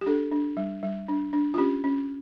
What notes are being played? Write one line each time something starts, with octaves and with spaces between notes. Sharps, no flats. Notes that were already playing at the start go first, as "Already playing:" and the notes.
G4
D4 A4
D4
G3
G3
D4
D4
F4
C#4 G4
C#4